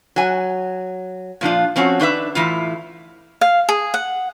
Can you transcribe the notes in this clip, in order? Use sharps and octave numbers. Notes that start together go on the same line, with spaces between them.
F#3 G#5
A#2 F3 D4 F4
F3 C4 C#4 F#4
D#3 D4 B4 E5
A2 E3 E4 F4
F5
G#4
F#5